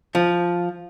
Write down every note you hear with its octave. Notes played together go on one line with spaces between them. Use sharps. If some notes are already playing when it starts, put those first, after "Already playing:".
F3